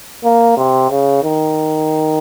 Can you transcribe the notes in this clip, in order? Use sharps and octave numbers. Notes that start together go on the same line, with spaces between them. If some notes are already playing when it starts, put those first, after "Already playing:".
A#3
C3
C#3
D#3